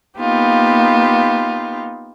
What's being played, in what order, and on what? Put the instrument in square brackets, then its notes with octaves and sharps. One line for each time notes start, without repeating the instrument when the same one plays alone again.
[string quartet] A#3 B3 D#4 F4 G4